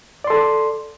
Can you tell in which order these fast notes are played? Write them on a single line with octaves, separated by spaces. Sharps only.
D5 C6 A4